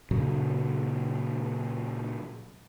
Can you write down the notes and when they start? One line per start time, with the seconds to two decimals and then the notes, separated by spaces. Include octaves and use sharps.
0.11 A#2 C#3 F#3